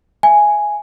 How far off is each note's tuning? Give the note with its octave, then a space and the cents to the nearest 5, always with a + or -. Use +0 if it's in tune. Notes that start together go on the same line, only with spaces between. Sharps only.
E5 +35 G#5 +0